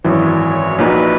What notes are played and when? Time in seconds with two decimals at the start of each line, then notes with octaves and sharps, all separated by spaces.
0.04 G#1 F#2 E3 C#5
0.78 A#1 A#2 A#3 D#4 F#4 B4